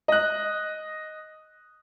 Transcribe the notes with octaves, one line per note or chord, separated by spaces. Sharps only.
D#5 F#6